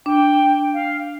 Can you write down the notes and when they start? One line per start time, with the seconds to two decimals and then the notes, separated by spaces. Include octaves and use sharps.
0.06 D4 G5
0.73 F5